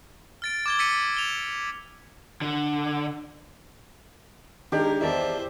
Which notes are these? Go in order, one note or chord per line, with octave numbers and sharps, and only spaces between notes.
F6 A6 D7
D6 G#6 G7
E6 A6 B6 C#7 D#7
F7 G7
D3
D#3 G#3 D4 G4 A#4
E2 D#3 E4 C5 D5 E5 A5